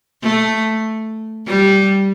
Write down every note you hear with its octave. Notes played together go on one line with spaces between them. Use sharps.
A3
G3